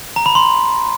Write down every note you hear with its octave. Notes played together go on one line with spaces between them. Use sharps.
A#5
B5
C6